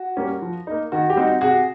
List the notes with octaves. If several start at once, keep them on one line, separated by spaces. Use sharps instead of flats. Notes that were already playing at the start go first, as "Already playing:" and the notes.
Already playing: F#4
G3 A#3 C#4
F3
A#3 D#4
D#3 F#4
G4
G3 C4 D#4 F#4
C3 F#4 G#4